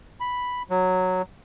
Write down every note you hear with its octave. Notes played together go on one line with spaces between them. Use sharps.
B5
F#3